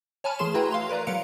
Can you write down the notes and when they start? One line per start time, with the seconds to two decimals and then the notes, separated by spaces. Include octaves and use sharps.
0.24 C#5 G#5 A5 B5 F6
0.39 E3 A3 G#4 C6 E7
0.54 E4 F#4 B4 G5 A#5 C6
0.71 F5 C6 F7
0.89 A#4 B4 D5 A#5
1.07 F#3 F5 C6 C#7 D7 F7